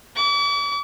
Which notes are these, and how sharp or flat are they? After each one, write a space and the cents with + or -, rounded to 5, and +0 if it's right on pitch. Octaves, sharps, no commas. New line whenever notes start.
D6 -45